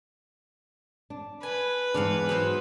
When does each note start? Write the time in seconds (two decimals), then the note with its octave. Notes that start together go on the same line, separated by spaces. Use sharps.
1.10 D4
1.43 B4 G#5
1.94 E2 G#2 D4 F5 F#5
2.29 F#3 B3 C5